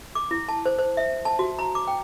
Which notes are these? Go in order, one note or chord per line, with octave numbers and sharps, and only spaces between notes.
D6
E4
A5
C5
C5
E5
A5
F#4
A#5
D6
G5